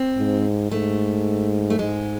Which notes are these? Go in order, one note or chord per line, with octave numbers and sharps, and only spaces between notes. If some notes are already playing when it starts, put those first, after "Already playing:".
Already playing: C4
G#2
G#2 A3
A3
G#2 G#3